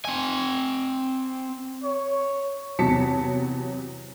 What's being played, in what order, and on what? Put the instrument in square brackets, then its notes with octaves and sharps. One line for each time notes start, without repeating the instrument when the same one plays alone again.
[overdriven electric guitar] C4 G#5
[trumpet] C#5
[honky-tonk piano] E2 C3 F#3 A5 B6 C#7